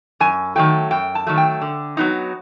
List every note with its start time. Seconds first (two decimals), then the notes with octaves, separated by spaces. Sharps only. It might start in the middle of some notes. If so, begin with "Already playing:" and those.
0.20 F#2 G#5
0.55 D#3 F#3 A3 G5
0.91 F#2 G5
1.15 A5
1.27 D#3 F#3 A3
1.38 G5
1.61 D3
1.97 F#3 B3 D#4